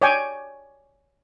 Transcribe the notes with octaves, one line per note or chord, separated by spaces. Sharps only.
C#5 D5 G5 G#5